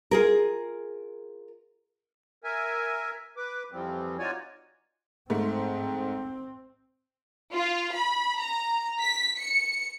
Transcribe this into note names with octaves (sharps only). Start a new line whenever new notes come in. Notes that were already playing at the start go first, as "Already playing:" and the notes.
F4 G#4 A#4
A#4 E5 G#5
B4 D6
F2 E3 F3 G3 C4
D#4 F4 F#4 C#5 D5 G#5
G#2 A3 C4
F4
B5
A#5
B6
C#7